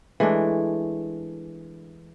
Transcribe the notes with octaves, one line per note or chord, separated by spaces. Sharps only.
E3 G#3 A3 D4